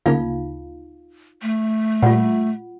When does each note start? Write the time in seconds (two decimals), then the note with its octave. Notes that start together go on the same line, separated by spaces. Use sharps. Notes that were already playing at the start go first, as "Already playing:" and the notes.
0.06 D2 C#3 A#3 D#4 F4 F5
1.42 A3
2.03 A#2 G3 F4 F#5